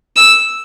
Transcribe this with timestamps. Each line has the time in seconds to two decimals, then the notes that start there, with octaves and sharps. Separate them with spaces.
0.16 E6